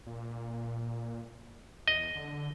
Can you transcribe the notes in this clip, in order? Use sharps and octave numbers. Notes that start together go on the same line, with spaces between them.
A#2
E2 D#5
D3